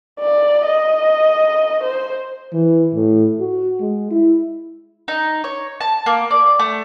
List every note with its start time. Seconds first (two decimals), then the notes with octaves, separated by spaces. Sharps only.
0.20 D5
0.65 D#5
1.83 C5
2.53 E3
2.95 A2
3.40 F#4
3.81 G#3
4.11 E4
5.08 D#4
5.44 C#5
5.81 A5
6.06 A#3
6.31 D5
6.59 A3